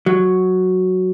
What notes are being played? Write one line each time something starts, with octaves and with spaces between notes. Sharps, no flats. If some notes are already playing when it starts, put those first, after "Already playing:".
F#3